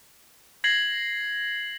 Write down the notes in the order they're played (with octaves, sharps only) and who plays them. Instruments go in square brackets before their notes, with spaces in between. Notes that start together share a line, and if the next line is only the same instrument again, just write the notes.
[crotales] G#6 A#6 C7 F#7